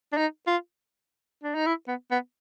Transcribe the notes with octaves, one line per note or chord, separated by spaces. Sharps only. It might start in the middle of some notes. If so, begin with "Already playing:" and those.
D4
D#4
F4
D4
D#4
E4
B3
B3